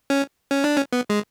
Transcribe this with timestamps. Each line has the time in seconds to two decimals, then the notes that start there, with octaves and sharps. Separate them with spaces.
0.10 C#4
0.51 C#4
0.64 D4
0.77 C#4
0.93 B3
1.10 G#3